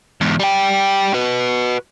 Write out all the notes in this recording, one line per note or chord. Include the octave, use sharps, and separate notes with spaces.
E2 G#2
G3 G5
F#4 B4